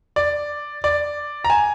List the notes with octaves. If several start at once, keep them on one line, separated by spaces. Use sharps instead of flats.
D5
D5
A#5
G#5